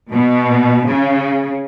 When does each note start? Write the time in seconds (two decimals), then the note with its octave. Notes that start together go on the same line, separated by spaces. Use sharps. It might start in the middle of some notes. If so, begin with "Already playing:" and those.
0.12 B2
0.88 C#3